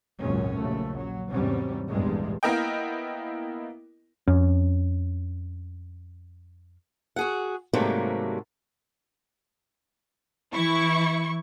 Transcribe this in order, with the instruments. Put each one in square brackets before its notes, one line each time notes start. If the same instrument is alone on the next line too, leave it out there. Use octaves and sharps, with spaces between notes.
[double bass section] G#1 C#2 F#2 A#2 G#3 C#4
A#1 D#2 C#3 A3
F#3
E2 G#2 C3 F#3 G3 C#4
A#1 E2 G2 G3 G#3
[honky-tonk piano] A#3 B3 E4 A#4 D#5 G5
[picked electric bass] F2 C#4
[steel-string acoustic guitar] F#4 G#4 F#5
G#2 C3 F#3 G3 A3 A#3
[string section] E3 E4 C#6